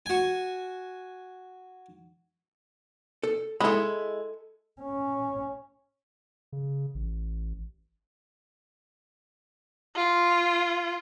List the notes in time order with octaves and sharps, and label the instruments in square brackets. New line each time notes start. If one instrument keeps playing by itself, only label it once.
[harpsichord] F#4 G#5
[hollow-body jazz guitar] A4
[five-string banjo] G#3 E4 [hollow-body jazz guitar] A4 B5
[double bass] C#4
[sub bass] C#3
A1
[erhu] F4